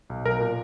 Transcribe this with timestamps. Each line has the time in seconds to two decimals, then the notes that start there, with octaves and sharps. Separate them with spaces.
0.10 B1
0.25 B1 A#4
0.40 A#2